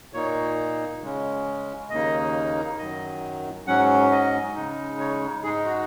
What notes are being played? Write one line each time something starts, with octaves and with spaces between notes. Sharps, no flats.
A#2 A#3 D#4 C#5
C#3 G#3 C#4
D#2 C#3 A#3 D#4 D#5
F#2 D#3 F#3 D#5
G#2 F#3 C#4 F#5
D#5
C#3 G#3 D#4
C#5
G#2 G#3 D#4 G#4
F#4